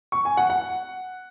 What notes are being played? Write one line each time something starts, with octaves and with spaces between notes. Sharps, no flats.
C#6
G#5
F#5
F#5